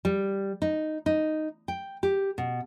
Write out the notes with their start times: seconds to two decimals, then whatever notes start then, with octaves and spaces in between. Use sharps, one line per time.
0.05 G3
0.62 D#4
1.06 D#4
1.68 G5
2.03 G4
2.38 B2